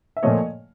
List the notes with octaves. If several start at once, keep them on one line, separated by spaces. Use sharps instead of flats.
E5
A#2 F3 A3 C#5 D#5